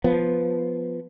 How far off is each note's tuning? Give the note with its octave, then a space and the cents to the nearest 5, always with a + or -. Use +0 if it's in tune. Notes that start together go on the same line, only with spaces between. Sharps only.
F3 +0 B3 +0